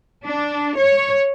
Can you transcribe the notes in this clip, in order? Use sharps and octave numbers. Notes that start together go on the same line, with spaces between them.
D4
C#5